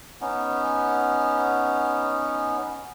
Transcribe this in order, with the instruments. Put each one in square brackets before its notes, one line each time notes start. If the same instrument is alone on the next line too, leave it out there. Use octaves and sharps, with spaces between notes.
[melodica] B3 C#4 D#4